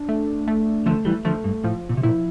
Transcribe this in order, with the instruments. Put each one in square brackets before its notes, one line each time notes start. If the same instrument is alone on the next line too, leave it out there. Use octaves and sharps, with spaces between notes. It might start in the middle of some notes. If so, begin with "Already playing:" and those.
Already playing: [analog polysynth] D4
A3
A3
[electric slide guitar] D3 F3 [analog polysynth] A3
[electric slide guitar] E3 G3
[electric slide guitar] D3 F3 [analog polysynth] A3
[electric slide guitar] G2
[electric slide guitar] A2 [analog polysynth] F3
[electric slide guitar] A#2
C3
[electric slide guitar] A#2 [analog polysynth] E4